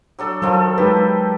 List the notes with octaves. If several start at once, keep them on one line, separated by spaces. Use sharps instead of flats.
F#3 D4 A4
D#3 F3 F#3 A4
G#3 D#4 G4 B4